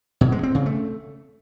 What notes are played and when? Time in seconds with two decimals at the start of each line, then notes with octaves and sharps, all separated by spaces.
0.21 B2
0.32 G#3
0.43 C4
0.55 C#3
0.66 A3